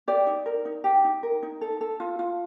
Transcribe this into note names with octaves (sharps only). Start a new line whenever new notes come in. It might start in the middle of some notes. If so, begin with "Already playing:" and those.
G4 D5
D#4
A#4
D#4
G4
D#4
A#4
D#4
A4
A4
F4
F4